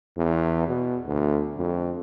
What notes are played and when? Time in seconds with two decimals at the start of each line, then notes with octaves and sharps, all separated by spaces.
0.17 E2
0.68 B2
1.06 D2
1.58 F2